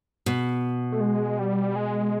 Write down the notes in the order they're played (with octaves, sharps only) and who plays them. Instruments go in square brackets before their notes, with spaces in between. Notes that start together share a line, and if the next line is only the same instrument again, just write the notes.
[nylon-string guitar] B2
[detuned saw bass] A3
G#3
G3
G#3